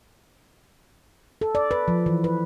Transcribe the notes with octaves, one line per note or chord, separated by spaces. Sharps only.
A4
D5
B4
F3
E3
B4